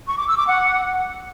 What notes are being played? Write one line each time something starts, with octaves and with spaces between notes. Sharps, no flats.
C#6
D6
E6
D6
F#5